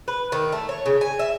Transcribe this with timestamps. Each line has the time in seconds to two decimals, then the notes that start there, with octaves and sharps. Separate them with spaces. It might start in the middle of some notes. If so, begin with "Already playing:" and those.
0.08 B4
0.32 D#3
0.52 A3
0.69 C#5
0.86 C#3
1.01 G#5
1.19 E5